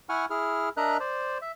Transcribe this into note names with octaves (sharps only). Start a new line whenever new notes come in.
E4 F#5 G#5 C#6 F6
E4 G#4 F6
D4 A#4 D#5 E5 A#5 F#6
C5 D5
E5